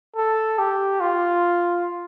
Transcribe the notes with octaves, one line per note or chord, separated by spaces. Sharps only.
A4
G4
F4